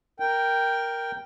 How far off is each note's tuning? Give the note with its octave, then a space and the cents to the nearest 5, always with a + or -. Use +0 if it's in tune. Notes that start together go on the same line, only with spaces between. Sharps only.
A#4 +0 G5 +0